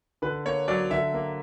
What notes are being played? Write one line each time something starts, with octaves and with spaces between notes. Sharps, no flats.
D3 B4
A#3 C#5
F#3 D5
D3 E5
A#3